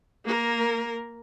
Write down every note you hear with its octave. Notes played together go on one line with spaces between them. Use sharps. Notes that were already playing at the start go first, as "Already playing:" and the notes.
A#3 A#4